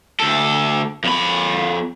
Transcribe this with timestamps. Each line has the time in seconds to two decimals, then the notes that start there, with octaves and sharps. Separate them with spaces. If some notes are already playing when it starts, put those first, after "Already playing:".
0.20 D2 A4
1.04 F2 B5